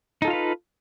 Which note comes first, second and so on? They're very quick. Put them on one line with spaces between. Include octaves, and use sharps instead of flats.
D#4 A4 F4 F5 B4